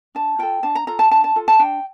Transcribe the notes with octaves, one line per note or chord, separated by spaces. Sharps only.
D4 A5
F4 A4 G5
D4 A5
A#5
F4 A4 A#5
A5
D4 A5
A5
F4 A4
A5
D4 G5